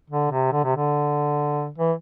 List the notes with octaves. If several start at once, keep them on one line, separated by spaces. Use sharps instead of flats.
D3
C3
D3
C3
D3
E3